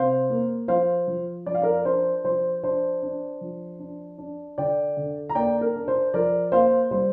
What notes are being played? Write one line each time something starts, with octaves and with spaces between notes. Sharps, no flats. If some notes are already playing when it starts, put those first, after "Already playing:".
Already playing: C3 C5 F5
A#3
F3 C5 F5
F3
F3 D5
F5
A#4 D5
D4 C5
F3 C5
D4 C5
D4
F3
D4
D4
D3 D5 G5
D3
A#5
A#3 D5 G5
A#4
D4
C5
F3 A#4 D5
A#3 C5 F5
G3 C5